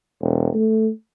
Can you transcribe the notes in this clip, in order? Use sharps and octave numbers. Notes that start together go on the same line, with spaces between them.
E1
A3